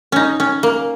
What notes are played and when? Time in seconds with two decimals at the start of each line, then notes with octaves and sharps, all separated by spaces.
0.12 C#4 D#4
0.40 C#4
0.63 A#3